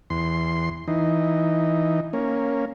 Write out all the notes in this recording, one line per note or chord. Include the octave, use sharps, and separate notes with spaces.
E2 C6
E3 D#4
A#3 C#4